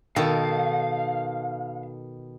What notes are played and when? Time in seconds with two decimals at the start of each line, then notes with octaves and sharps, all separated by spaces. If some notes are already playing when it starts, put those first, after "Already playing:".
0.16 B2 D#3 A4 F5